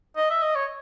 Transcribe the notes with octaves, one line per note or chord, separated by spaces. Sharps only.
D#5
E5
D#5
C#5